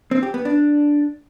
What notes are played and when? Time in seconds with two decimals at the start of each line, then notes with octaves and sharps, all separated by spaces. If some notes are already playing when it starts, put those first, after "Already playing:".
0.11 C4
0.23 G4
0.34 B3
0.45 D4